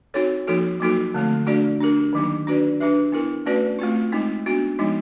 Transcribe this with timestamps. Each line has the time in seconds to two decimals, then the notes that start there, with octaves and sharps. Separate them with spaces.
0.14 C4 D#4 F#4 A4 C#5
0.47 F3 A#3 D#4 F#4 A4
0.80 F#3 A#3 D#4 F#4 A4
1.14 D3 F3 A3 C4
1.47 A3 D4 F#4 A4 D5
1.80 D4 G4 A#4
2.13 D#3 F#3 A#3 D#4 G4
2.47 D4 F#4 B4 D5
2.80 D4 G4 B4 E5
3.12 B3 E4 G4 A#4
3.46 A3 C#4 F#4 B4 D5
3.79 A3 C4 F4
4.12 G#3 C4 D#4
4.46 B3 D4 F#4
4.79 F3 G#3 B3 D#4